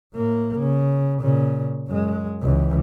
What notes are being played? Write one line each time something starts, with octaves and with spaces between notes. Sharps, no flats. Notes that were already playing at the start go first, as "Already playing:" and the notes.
A2 A#3
C#3
A#2 C#3
F#2 G#3
C#2 E3